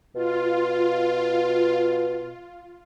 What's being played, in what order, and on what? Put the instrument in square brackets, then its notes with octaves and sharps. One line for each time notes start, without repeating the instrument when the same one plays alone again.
[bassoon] B2 [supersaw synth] F4